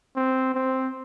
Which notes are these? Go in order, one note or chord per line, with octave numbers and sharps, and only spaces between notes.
C4
C4